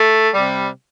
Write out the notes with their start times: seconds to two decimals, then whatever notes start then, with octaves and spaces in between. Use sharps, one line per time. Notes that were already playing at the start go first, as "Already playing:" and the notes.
Already playing: A3
0.33 C3 G3